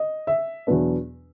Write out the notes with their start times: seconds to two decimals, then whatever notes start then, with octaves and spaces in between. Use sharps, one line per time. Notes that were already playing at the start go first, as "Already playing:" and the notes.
Already playing: D#5
0.27 E5
0.67 E2 B2 F#3 B3 D4